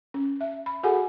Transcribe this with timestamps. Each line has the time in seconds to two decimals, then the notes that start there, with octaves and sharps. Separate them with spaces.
0.14 C#4
0.41 E5
0.66 B5
0.83 F#4 G#4 A4 F#5 G#5